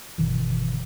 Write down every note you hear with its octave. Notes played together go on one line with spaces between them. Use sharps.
G1 B2 D#3 E3